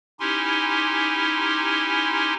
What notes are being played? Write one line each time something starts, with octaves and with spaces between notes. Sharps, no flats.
C#4 D#4 E4 G4 G#5 C6